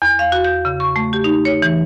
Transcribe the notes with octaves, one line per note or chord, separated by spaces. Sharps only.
E2
F5
F#4
G6
C#3
C#6
A3
G4
D#4
C#5
E3